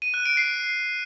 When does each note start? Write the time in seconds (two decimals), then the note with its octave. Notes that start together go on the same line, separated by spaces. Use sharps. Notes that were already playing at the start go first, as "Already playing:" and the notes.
0.02 D#7
0.14 F#6
0.26 D7
0.37 C7